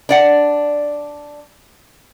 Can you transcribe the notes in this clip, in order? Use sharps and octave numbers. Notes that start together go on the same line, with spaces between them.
D4 D5 F#5